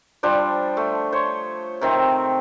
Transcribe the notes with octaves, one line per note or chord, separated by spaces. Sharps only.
F3 G3 D4 C5
A3
C5 C#5
C3 D#3 C4